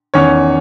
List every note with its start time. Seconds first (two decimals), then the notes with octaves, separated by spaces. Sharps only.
0.14 E2 D#3 C#4 C#5